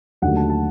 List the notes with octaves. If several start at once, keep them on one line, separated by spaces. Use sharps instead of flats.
D#2 D3 F#3 A3 F#5
A5
A5